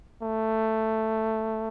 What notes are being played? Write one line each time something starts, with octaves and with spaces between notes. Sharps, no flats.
A3